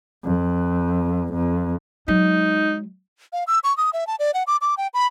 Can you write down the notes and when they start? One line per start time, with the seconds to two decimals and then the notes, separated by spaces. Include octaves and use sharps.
0.25 F2
1.34 F2
2.08 F#3 G#3 D#4
3.33 F5
3.47 E6
3.64 C#6
3.77 D#6
3.93 E5
4.07 A5
4.19 D5
4.34 F#5
4.47 D6
4.61 D6
4.77 G5
4.94 B5